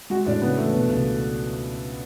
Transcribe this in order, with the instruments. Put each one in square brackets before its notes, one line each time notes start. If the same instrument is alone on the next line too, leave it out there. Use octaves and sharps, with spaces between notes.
[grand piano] G#3 [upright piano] F#4
[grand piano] A2 [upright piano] D4
[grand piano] C#3 [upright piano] B3
[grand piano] E2 [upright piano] A3
[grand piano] B2
C#2